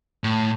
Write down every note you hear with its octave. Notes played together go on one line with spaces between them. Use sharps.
A2